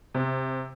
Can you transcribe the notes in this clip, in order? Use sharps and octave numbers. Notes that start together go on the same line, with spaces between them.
C3